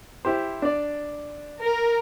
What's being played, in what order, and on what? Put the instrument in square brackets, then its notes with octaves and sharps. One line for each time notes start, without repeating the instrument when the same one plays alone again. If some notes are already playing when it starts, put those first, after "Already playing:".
[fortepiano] E4 G4 C5
D4 D5
[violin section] A#4